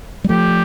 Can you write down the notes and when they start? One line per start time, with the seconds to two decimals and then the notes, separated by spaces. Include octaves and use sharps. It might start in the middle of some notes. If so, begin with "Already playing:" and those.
0.24 G3
0.29 F3 A3 G4